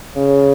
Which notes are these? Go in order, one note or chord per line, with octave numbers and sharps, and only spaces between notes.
C#3